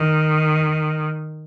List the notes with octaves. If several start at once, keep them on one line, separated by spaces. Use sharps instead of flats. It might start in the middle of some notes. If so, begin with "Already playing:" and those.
Already playing: D#3